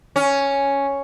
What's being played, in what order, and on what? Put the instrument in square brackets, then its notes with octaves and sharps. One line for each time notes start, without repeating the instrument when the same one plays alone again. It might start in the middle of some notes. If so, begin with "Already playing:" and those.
[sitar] C#4